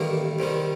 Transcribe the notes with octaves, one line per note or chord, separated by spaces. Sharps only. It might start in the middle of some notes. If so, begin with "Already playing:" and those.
Already playing: A1 G2 D#3 G3 A#3
C2 C3 D#3 G3